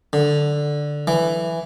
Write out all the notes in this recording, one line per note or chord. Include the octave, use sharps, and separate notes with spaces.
D3
E3